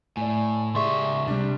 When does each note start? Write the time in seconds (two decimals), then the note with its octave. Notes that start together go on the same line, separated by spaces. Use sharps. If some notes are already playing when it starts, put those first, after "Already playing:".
0.17 A2 D5 G#5
0.75 C#2 G4 G#4 D5 E5 C6 C#6
1.28 C3 G3 D4